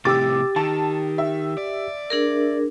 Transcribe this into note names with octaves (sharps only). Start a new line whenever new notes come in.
A2 C3 G4 D6 E6 A6
D#3 A5
E5
D5
D4 G#4 A#4